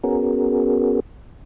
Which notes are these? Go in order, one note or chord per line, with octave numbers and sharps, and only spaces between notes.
B3 C#4 F#4 G#4 A#4